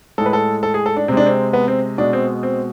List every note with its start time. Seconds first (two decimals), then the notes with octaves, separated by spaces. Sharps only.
0.18 A2 G#3 A4
0.26 B4
0.33 A4
0.63 A4
0.74 G#4
0.86 A4
0.97 D4
1.08 C3 G#3 C4
1.17 D4
1.26 C4
1.53 B3
1.68 C4
1.98 B2 G#3 D4
2.13 C4
2.43 C4